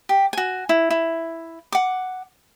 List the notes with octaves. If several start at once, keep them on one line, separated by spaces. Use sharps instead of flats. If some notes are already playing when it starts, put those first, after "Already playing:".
G4
F#4 G#5
E4
E4
F#5 D6